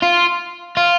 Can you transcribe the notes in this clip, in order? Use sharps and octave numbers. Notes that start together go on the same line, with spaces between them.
F4
F4